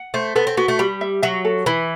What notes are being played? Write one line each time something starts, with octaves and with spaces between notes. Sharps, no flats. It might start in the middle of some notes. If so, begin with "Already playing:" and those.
Already playing: F#5
A3 C5
B3 A4
C4
B3 F#4
A3
G3 B5
E5
F#3 E5
A4
E3 B5